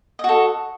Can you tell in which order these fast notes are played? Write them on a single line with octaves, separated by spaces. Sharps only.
D#5 F#4 A4